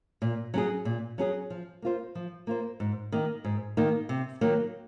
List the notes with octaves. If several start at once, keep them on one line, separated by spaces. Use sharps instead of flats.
A#2
F#3 C#4 G#4
A#2
F#3 C#4 G#4
F3
A#3 F4 C5
F3
A#3 F4 C5
G#2
D#3 A#3 D#4
G#2
D#3 A#3 D#4
C3
D#3 F#3 A#3